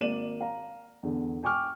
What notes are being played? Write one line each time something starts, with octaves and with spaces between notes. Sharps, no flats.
G#1 A#3 D5 D#7 E7 F#7
F5 A#5
E2 D3
G5 G#5 C#6 D6 F6